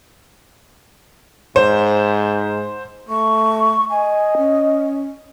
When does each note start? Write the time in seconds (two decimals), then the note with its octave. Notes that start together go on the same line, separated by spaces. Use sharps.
1.56 G#2 C5
3.09 A3 C#6
3.90 D#5 G#5
4.38 C#4